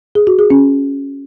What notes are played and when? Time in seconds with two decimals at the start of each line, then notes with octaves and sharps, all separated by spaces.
0.15 G#4
0.27 F#4
0.39 G#4
0.50 C#4